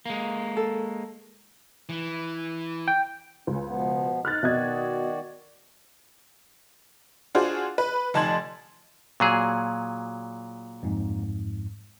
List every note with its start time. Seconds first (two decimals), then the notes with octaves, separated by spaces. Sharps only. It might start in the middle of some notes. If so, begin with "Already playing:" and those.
0.06 G#3 A#3
0.57 A4
1.89 E3
2.88 G5
3.47 C#2 C#4
3.66 B2 F3 B3
4.25 D#4 F6 F#6 A6
4.43 B2 D#3 F#4 D5 D#5 G#6
7.35 D4 F4 F#4 G#4 C5
7.78 B4
8.14 F1 D#4 A5 C6 G#6 F#7
9.20 A#2 F#3 G#4 D#6
10.83 F2 G#2